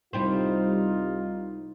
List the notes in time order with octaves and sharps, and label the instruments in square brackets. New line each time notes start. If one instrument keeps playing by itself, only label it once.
[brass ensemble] C2 D#4 F4 [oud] G3 G4 C5